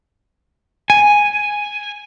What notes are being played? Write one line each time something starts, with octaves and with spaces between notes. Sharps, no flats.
G#5